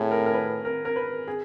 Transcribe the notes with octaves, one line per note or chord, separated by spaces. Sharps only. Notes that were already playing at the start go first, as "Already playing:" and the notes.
Already playing: A2 G#4
A#4
A#4
B4
A#4
A#4
B4
G#4